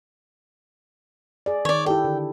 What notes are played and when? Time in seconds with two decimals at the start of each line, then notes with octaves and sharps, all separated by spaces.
1.46 G#4 D5
1.65 D#3 C#5 D5
1.86 E4 G4 A4 G5
2.04 D3